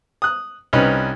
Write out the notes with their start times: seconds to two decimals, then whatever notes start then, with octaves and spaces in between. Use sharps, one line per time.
0.22 D#6 F#6
0.73 C2 C#4 D#4 B4